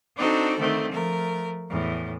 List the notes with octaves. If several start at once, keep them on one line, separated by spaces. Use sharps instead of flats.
C4 D4 D#4 F#4 A4 C5
D3 D#3 A3 C4
F3 A3 A#4
E2 A2